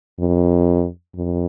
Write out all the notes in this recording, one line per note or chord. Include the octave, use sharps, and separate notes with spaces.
F2
F2